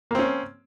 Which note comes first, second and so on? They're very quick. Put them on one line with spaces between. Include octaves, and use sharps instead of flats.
A#3 C4 C#4